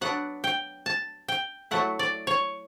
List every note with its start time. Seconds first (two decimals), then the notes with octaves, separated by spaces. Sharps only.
0.01 F#3 B3 D4 F#5
0.44 G5
0.86 A5
1.28 G5
1.71 F#3 A3 E4 F#5
1.99 D5
2.27 C#5